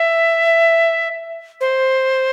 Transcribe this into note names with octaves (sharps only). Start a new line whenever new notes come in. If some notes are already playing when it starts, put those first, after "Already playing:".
Already playing: E5
C5